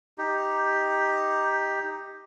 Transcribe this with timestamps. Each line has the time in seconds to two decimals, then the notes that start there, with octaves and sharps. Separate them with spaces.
0.18 D#4 G4